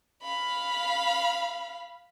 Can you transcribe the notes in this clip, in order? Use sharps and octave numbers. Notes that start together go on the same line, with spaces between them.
F5 B5